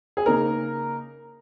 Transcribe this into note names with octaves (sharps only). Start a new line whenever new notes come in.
G#4
C#3 A#3 D#4 A#4